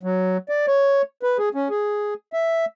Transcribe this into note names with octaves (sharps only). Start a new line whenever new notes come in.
F#3
D5
C#5
B4
G#4
C#4
G#4
E5